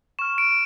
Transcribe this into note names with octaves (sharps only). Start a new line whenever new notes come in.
C#6 F6 E7
D7